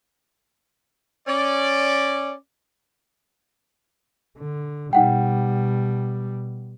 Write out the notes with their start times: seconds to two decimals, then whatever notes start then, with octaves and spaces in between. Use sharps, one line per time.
1.28 C#4 D5
4.38 D3
4.93 B2 G3 D#4 F#5 G5